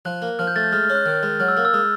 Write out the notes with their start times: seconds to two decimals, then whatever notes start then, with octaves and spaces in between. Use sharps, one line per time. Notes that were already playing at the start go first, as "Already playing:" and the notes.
0.05 F3 F#6
0.22 A#3
0.39 F3 F6
0.47 G6
0.56 A3 A6
0.64 G6
0.72 G#3 F6
0.84 F6
0.90 C#4
0.95 F#6
1.06 D#3
1.23 G#3
1.40 F#3 F6
1.48 E6
1.57 A#3 F6
1.65 E6
1.73 G#3 D#6